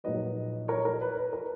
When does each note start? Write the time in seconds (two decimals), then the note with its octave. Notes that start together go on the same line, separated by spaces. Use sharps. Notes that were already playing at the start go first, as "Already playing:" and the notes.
0.04 A#1 A#2 F#3 A#3 D#4 B4 D#5
0.68 A#4 C#5
0.85 A#4
1.01 B4
1.17 B4
1.33 A#4